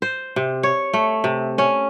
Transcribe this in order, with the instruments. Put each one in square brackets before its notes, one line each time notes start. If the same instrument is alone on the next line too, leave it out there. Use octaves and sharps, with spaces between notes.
[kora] C5
C3
C#5
A3
C3
C#4